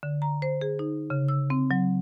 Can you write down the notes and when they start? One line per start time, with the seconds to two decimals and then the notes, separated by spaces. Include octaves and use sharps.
0.03 D3
0.22 A#5
0.42 C5
0.61 G#4
0.79 D#4
1.10 C#3
1.28 E6
1.50 C4
1.71 F#3